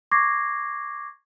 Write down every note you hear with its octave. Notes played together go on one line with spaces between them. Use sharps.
C#6 D6 G#6 A#6 C7